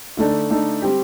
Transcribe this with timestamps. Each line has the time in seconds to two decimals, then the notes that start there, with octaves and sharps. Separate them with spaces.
0.17 D3 A3 D#4 A4 D5
0.50 D3 A3 D#4 A4 D5
0.82 G3 C4 G4